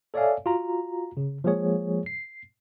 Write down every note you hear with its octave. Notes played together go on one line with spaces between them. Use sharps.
A4 C#5 D5 E5 F5 G#5
F4 F#4 A#5
C#3
F3 G#3 A#3 G#4 C#5
C7